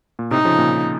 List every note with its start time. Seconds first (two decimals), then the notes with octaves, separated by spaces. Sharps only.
0.19 A#2
0.31 A2 C3 D#4
0.45 C#3 F3
0.58 A#2 C#3